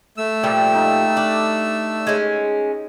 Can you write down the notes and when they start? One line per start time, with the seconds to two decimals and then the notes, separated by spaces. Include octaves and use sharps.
0.17 A3 E6
0.43 A#2 F3 G3 G4
0.75 D#4
1.17 D4
2.07 G#3 C#4